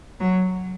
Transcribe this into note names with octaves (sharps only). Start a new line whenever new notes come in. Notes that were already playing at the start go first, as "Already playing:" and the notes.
F#3